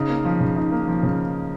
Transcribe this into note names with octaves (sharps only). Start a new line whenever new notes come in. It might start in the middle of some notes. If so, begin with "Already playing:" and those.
Already playing: C#3 D#4
A#3
F3
C#3
D#4
A#3
F3
C#3